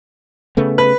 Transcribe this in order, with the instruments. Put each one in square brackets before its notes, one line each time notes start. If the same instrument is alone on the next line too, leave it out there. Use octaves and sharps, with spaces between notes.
[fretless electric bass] C#3 A3 B3
[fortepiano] B4